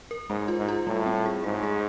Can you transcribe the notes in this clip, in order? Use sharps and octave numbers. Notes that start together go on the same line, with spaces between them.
A#4
G#2 G#3
F4
G#2
F4
A2 G3
C4
G#4
G#2 G#4
G#4